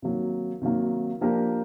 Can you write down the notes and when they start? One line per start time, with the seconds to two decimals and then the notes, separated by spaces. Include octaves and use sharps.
0.02 C3 D#3 F#3 A#3
0.61 C3 D#3 F#3 A#3
1.21 F3 A#3 D4 G4 A#4